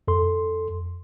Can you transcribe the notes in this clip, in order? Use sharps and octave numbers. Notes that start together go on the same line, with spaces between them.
F2 A4 C6